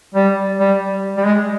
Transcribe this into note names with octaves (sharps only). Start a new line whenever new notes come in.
G3
G3
G3
G#3